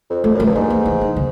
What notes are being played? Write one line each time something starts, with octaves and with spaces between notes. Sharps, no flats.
F2
F2 A3
F#2
F3
G2
G#2 A#3
A#3
E3
D#3
D3